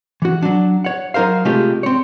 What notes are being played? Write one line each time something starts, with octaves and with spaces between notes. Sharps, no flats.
E3 F#4
F#3 D4
C#5 F#5
F#3 D#4 A#4 C5 F5
C3 G#3 A3 D#4 F4 G4
C4 C#5